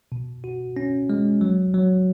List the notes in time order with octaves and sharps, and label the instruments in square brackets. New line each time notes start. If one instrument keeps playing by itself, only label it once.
[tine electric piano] B2
F#4
C#4
G#3
F#3
F#3